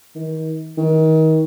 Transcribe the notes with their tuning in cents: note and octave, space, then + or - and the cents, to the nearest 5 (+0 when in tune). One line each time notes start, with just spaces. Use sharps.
D#3 +35
D#3 +30